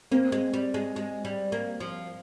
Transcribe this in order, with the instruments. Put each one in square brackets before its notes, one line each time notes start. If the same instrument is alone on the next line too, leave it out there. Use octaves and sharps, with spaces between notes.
[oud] A#3 [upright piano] C4
[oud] G#3
G3
G#3
G#3
G3
A#3
F3